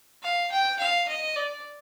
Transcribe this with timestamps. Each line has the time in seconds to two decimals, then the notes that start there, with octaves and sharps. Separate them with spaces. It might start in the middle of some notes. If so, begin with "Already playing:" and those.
0.23 F5
0.52 G5
0.79 F5
1.08 D#5
1.36 D5